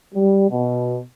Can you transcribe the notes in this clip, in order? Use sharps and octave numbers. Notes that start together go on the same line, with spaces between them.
G3
B2